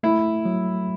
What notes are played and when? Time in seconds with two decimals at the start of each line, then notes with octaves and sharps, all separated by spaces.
0.03 A3 E4
0.45 F#3